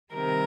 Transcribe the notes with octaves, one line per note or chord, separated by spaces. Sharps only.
C3 D#3 G3 A#4